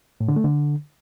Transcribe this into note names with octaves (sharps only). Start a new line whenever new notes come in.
A2
D3
A3
D3